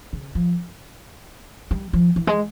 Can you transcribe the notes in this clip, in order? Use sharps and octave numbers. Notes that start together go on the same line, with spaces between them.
C#3
F3
G3
F3
E3
G#3